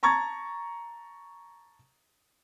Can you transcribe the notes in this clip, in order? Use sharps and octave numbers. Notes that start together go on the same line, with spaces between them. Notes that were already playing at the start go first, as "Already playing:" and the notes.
A5 A#5 C#6 G#6 A6